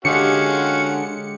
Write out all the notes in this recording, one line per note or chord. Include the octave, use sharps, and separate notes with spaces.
D3 G#3 C#4 F#4 G4 F5 C#7